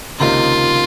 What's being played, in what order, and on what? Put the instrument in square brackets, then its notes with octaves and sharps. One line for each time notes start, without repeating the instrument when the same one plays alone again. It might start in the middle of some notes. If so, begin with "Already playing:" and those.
[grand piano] C#2 C3 D#3 A#3 D#4 [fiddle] F4